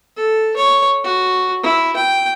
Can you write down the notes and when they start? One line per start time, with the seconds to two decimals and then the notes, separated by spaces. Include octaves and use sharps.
0.16 A4
0.56 C#5
1.04 F#4
1.63 E4
1.96 G5